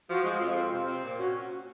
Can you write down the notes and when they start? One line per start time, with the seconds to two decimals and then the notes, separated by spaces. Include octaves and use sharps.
0.09 F3 F#4
0.24 G#3 F4
0.40 F2
0.55 C4
0.72 C3
0.87 C4
1.03 A#2
1.18 C#4 F#4